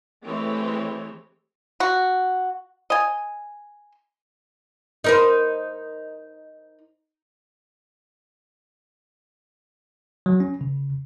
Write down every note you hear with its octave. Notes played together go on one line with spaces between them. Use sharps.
E3 G#3 A3 C4 G4 C#5
F#4
D#5 G#5
D#4 A#4 C5
F#3
C#4
C#3